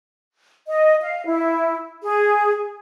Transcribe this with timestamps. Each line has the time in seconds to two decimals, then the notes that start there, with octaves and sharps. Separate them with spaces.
0.68 D#5
1.02 F5
1.26 E4
2.02 G#4